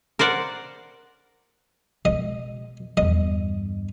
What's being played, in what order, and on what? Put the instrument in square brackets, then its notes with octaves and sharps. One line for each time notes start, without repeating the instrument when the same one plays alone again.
[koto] A#4 C5 D5 F#5
[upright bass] B2 G#3 [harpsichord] D#5
[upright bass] E2 G2 [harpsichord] D#5